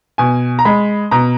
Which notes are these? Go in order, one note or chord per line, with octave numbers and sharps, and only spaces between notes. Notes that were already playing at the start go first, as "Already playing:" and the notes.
B2 G#5
A#5
G#3 B5
B2 A#5